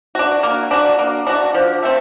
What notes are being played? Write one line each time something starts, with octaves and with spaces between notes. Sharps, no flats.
D4 F#4
A#3
D4 F#4
A#3
D4 F#4
F3
A3 C4